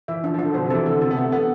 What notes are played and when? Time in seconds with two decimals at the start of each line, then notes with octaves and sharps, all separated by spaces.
0.08 E3 E5
0.24 F3 D4
0.34 F3
0.39 D4
0.44 D3
0.54 B2 C5
0.66 C3
0.70 E3 A4
0.86 D3 A4
1.02 C3 A4
1.11 B3
1.17 A3 A4
1.32 B3 A4